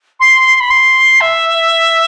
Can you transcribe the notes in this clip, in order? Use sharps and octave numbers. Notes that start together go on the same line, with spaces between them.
C6
B5
C6
E5